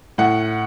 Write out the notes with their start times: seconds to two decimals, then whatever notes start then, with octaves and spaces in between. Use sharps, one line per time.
0.18 A2 F#5